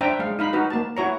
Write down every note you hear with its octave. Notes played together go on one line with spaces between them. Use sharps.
D4 C5 E5 G5 A#5
G#3 F5
D#4 F5 B5
D#4 F#4 B4
A#3 A5
E4 F#4 C#5 A#5